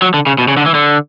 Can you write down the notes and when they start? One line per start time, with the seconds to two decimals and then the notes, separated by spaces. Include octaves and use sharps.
0.02 F#3
0.14 D3
0.27 C#3
0.38 B2
0.48 C#3
0.57 D3
0.66 E3
0.74 D3